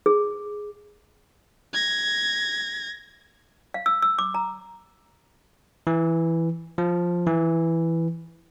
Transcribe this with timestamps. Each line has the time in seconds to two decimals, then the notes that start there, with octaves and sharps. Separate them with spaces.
0.06 G#4
1.73 G#6 A#6
3.74 F5
3.86 E6
4.02 E6
4.19 D6
4.34 A#5
5.87 E3
6.78 F3
7.27 E3